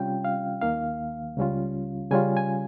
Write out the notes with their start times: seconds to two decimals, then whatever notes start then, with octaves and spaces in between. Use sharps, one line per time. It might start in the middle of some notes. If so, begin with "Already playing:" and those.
Already playing: C3 G3 C#4 F4 G5
0.25 F5
0.61 D#2 D#3 A#3 F5
1.37 C#2 C#3 G3 C#4 F4
2.11 C#3 G3 C#4 F4 G#5
2.37 G#5